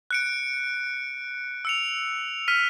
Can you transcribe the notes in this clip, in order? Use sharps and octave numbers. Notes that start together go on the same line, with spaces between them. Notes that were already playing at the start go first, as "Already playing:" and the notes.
F#6 C#7 D7
E6 C#7 F7
F6 B6 D#7